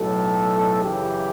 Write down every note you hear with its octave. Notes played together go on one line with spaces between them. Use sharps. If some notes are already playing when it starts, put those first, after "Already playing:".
Already playing: B1 A2 F#3 A4
F#2 C#3 E3 G4